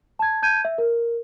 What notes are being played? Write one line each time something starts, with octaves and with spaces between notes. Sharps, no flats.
A5 G#6
A5 G6 G#6 D#7
E5
A#4